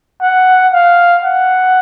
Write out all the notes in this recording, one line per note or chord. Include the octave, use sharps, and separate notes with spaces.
F#5
F5
F#5